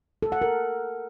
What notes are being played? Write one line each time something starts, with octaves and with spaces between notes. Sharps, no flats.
A4
F#5
A#4